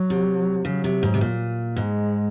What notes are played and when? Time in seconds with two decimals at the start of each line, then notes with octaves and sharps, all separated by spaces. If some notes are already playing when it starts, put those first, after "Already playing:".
Already playing: F#3
0.10 C3
0.65 C#3 F#3
0.84 C3
1.03 G#2
1.14 C3
1.21 A#2
1.76 G#2 G#3